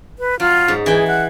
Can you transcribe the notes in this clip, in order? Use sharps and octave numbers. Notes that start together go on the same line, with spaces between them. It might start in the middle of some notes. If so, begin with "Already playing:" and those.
B4
F#3 F4
G#2
E3 G#4 G5
F#5